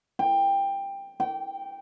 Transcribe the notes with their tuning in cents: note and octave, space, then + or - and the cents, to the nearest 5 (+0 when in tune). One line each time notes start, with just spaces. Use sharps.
G5 +15
G5 -20